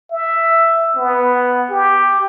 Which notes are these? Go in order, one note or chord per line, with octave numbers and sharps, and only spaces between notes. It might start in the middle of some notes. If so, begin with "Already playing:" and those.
E5
B3
G4